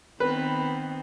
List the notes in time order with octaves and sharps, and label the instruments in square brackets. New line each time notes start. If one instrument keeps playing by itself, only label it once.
[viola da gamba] D#3 B3 C4 [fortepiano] B4